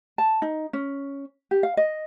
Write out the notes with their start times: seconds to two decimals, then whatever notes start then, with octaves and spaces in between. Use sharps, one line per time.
0.18 A5
0.42 D#4
0.73 C#4
1.51 G4
1.63 F5
1.77 D#5